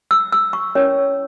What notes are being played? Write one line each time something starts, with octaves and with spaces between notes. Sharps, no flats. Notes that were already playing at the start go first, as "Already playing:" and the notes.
E6
E6
C#6
C#4 E4 A#4 C#5